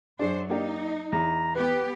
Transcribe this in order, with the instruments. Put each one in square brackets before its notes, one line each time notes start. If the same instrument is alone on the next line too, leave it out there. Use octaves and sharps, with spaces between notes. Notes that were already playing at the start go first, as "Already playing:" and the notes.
[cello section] F#2 F#3 C5 [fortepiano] D4 G#4
[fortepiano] A#3 D4 G4 [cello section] D#4
[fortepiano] E2 [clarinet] A#5
[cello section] B3 G4 [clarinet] B4